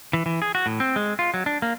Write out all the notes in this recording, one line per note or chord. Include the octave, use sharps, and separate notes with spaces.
E3
E3
G#4
F#4
A2
C4
G#3
F4
F#3
D4
A#3